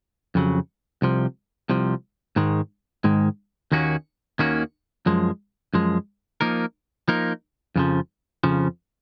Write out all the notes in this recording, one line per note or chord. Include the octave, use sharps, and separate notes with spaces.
F2 C#3 F#3
C2 C3 F3
C2 C3 F3
G#2 D#3 G#3
G#2 D#3 G#3
D#2 D#3 A#3 C#4 F#4
D#2 D#3 A#3 C#4 F#4
F#2 F3 G#3
F#2 F3 G#3
F3 A#3 D#4 A#4
F3 A#3 D#4 A#4
F2 C#3 F3
F2 C#3 F3